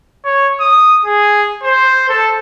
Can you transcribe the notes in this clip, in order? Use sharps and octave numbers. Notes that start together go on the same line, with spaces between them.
C#5
D#6
G#4
C5
A4